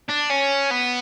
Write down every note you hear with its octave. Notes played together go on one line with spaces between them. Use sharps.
D4
C#4
B3